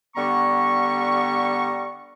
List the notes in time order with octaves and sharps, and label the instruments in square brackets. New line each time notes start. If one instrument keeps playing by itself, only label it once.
[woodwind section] D3 G3 B3 A#5 C#6